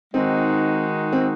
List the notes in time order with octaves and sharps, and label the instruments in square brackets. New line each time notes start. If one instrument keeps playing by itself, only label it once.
[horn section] D#3 G#3 D#4 F#4 [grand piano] C4
[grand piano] C4